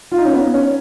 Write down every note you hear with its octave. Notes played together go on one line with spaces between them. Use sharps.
F4
D#4
C#4
B3
C#4